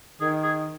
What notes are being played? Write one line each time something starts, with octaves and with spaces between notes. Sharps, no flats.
D#3 G#4
G#4